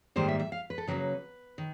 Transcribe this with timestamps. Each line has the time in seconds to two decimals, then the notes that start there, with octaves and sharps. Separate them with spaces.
0.16 G#2 D#3 G3 A#3 C5
0.28 E5
0.39 E5
0.52 F5
0.70 B4
0.78 A4
0.87 C#3 F#3 A#3 C#4 B4
1.58 D#3